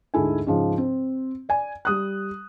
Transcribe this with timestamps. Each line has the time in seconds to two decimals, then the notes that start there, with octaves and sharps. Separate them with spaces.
0.14 D2 G#2 G#3 E4 A4 G#5
0.47 G#2 C#3 F3
0.78 C4
1.49 D5 G#5
1.85 G3 D#6 F#6